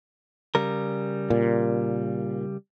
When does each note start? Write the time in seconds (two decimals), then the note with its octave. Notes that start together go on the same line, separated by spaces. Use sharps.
0.55 C#3 G3 A#4
1.30 A#2